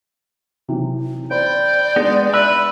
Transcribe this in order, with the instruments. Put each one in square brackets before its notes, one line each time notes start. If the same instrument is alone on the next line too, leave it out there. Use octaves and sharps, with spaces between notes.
[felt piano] C3 E3 F#3
[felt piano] C5 B5 [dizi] D5 [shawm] G5
[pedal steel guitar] G#3 B3 [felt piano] D4 G#4 A#6
[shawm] B4 [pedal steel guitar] E5 B5 E6 [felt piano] F#6